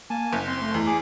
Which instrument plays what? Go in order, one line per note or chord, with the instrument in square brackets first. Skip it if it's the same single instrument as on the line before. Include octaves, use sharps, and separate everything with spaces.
[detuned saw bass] A#3 [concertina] G#5 A5
[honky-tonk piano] F#1
[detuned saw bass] C4 [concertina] C6
[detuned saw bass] A3
[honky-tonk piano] E2
[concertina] G#4 D6